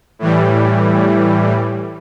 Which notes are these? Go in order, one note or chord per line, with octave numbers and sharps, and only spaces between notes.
A2 E3 G3